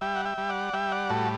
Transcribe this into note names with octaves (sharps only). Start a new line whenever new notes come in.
G3 E5 G5
F#5
E5 G5
G3
D5 F#5
G3 E5 G5
D5 F#5
A2 F#4 A4